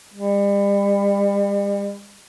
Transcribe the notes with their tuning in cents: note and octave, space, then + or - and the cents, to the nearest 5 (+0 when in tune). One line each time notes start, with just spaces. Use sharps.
G3 +40